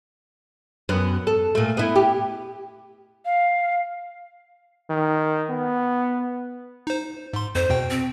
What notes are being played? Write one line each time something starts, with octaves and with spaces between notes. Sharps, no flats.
F#2 B3
A4
A#2 A3
B3 E4
G4
F5
D#3
B3
D#4 C5
G#2 C6
F2 C5
E2 B2 G5
C4